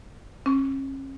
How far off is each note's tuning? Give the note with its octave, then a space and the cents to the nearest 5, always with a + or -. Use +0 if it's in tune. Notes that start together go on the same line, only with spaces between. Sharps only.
C#4 -40 C#6 +40